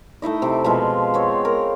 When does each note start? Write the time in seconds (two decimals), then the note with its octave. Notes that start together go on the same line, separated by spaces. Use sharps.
0.22 A3 D#4 E4 D#5
0.42 C3 D6
0.64 B2 F3 G#3 F4
1.14 B3 C4 C#5
1.45 A#4